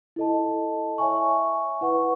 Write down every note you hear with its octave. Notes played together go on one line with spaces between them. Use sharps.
E4 A4 D#5 A5
C#5 E5 G#5 C#6
E4 B4 F#5 C#6